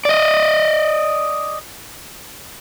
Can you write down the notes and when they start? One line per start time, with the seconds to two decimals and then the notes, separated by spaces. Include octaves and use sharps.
0.05 D5 D#5